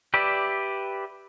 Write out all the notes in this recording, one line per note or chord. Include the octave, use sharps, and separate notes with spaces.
G4 B4 D5 E5